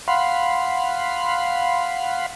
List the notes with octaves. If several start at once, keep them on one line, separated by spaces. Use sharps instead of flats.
F5 F#5 B5 C6